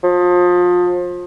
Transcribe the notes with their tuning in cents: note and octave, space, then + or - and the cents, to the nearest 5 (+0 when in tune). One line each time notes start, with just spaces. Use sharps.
F3 +30